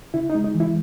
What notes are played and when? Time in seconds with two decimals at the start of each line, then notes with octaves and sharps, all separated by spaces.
0.14 C#3 E4
0.30 D#4
0.35 G#3
0.44 D#4
0.55 E3
0.60 E4